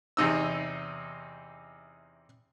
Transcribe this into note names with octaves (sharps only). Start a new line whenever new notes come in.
E2 C3 D#4 E6